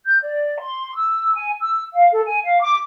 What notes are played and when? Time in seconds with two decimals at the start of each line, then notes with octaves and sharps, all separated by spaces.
0.05 G6
0.21 D5
0.60 C6
0.94 E6
1.35 G#5
1.60 E6
1.93 F5
2.12 A4
2.26 G#5
2.44 F5
2.60 D6